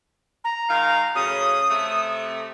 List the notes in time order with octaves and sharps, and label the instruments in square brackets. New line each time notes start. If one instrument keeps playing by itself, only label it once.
[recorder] A#5
[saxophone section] D#3 G#3 F5
[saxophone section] F#2 A2 C#3 [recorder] D#6
[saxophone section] C3 A3